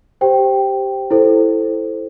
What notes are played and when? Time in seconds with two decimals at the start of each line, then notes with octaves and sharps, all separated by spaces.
0.21 G4 C5 G5
1.11 E4 A4 C5